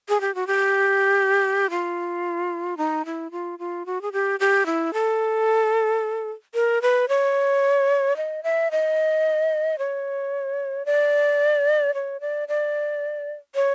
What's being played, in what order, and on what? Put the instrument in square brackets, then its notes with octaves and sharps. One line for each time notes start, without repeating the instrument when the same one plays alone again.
[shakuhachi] G#4
G4
F#4
G4
F4
D#4
E4
F4
F4
F#4
G#4
G4
G4
E4
A4
A#4
B4
C#5
D#5
E5
D#5
C#5
D5
C#5
D5
D5
C#5